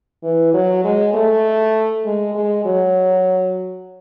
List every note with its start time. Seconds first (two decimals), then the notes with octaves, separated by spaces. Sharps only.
0.23 E3
0.54 F#3
0.84 G#3
1.14 A3
2.05 G#3
2.35 G#3
2.65 F#3